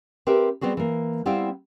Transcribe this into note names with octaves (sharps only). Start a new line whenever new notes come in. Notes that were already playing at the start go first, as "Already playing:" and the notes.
C4 G4 A#4 B4 E5
G3 B3 C4 F#4 G#4
E3 A#3
G3 B3 C4 E4 F5 G5